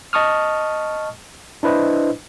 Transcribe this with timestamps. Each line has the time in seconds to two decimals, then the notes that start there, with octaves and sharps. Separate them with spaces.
0.13 D#5 A5 C#6 D#6 F6
1.63 D4 E4 B4 C5 D#5